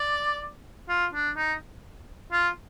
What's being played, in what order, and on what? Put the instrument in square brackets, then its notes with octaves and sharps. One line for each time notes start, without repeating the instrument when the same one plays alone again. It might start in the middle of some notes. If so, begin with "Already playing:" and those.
Already playing: [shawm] D5
F4
D4
D#4
F4